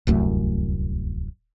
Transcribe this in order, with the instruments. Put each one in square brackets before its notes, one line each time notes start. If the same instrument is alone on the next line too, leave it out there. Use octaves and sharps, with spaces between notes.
[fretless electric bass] D1 C2 F#2 A3